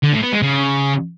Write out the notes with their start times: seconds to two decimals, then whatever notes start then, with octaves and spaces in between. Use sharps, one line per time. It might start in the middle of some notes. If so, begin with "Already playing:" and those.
0.03 D3
0.13 A2
0.23 B3
0.33 G#3
0.42 C#3